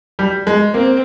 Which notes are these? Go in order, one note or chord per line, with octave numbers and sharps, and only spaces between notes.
G3
G#3
A#3 C4